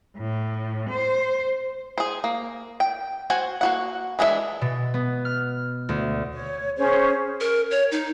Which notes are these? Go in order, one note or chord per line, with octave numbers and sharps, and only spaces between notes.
A2
C5
G#4 C5
A#3
G5
F#4 C5 F#5 G#5
A#3 F#4 F#5
E3 G#3 B3 D4 E5
B2
B3
F6
D2
C#5
C#4 G#4 C5 C#5
A#4
C#5
D#4